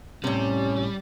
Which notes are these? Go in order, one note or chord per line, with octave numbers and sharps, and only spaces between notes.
A2 C3 G3 C#4